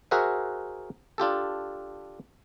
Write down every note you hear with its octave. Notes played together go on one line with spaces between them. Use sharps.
F#4 G#4 A#4 C5 E5 F#5
D4 F4 G4 A4